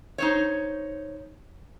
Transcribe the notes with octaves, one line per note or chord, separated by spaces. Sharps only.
D#4 C5 C#5